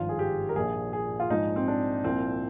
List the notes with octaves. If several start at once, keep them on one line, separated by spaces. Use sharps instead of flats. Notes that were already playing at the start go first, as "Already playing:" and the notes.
Already playing: G#1 G2 F3 F4
G#4
G4
A#4
A#1 A#2 F3 G#4
G#4
F4
A#1 G#2 F3 G#3 D#4
C4
D4
C2 A#2 F3 C4